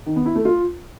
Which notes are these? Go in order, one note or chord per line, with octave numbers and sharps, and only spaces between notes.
D#3
B3
E4
A3
F4